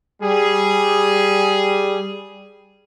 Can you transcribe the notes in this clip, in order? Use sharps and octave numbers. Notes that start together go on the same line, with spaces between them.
G3 G#4